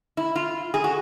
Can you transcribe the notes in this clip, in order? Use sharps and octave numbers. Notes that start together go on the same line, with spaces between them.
E4
F4
G#4
F#4